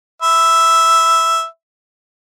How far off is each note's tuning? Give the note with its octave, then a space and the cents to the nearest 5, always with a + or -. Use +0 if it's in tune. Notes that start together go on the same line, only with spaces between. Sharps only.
E5 +0 B5 +25